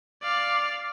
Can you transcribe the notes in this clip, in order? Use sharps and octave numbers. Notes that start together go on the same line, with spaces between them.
D5 F5